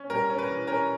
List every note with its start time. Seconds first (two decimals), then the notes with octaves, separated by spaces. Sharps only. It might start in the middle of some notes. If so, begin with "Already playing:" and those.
Already playing: C#4
0.10 G3 A#4
0.30 C#4
0.39 B4
0.48 E3
0.67 C#4 A#4